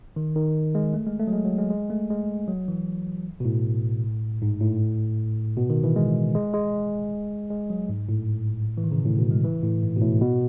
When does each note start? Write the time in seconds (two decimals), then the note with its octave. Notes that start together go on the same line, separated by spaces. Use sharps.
0.16 D#3
0.36 D#3
0.75 G#3
0.94 A3
1.06 G#3
1.19 A3
1.27 F#3
1.32 G#3
1.45 F#3
1.58 G#3
1.71 G#3
1.90 A3
2.10 G#3
2.48 F#3
2.68 E3
3.40 B2
3.45 A2
4.42 G#2
4.60 A2
5.57 B2
5.70 D#3
5.84 E3
5.96 G#3
6.35 G#3
6.54 G#3
7.50 G#3
7.70 F#3
7.89 G#2
8.09 A2
8.77 E3
8.84 D#3
8.92 C#3
8.98 B2
9.05 A2
9.19 B2
9.31 G#3
9.44 E3
9.63 A2
9.83 G#2
9.96 B2
10.01 A2
10.21 B2